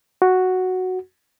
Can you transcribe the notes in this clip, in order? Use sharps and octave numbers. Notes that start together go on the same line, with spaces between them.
F#4